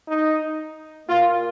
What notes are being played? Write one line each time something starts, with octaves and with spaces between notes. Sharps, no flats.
D#4
A#2 A#3 F4